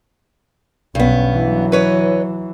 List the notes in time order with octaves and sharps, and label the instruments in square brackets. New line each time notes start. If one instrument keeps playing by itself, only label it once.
[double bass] B1 C#4 [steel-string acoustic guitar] G2 B3
[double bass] E3 F#3
[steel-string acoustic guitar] B4 C#5 D#5